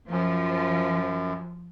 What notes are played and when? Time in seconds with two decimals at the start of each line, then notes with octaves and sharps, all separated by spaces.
0.11 F#2 F3